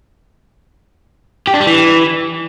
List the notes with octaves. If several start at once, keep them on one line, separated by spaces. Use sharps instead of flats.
G4
D4
G3
E3